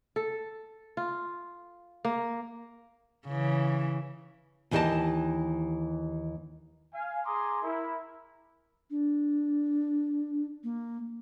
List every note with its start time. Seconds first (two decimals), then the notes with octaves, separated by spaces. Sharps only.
0.16 A4
0.97 F4
2.05 A#3
3.28 C#3 E3
4.71 D#2 E3 E4 G4 D#5 A5
6.93 F5 G#5
7.25 G#4 G#5 A#5 C6 D6 D#6
7.63 E4 A#4
8.90 D4
10.63 A#3